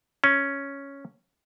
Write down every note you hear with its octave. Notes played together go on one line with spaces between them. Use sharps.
C#4